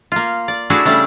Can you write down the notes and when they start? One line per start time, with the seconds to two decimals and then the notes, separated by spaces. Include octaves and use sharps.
0.12 A#3 F4
0.48 D5
0.70 A3 D4 E4 F#4 G#4 A4
0.85 C#3 G3 A3 D4